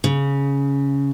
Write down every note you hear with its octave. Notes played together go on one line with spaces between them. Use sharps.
C#3